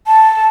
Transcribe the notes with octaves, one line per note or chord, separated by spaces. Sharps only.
A5